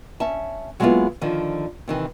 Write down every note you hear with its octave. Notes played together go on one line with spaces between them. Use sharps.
C#4 E5 A5
F#3 G#3 A#3 B3 E4 F4
D3 D#3 F3
C3 D#3 E3